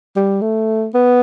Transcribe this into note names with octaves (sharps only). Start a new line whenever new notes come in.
G3
A3
B3